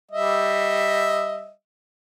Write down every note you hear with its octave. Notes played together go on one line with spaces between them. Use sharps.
G3 D#5 E5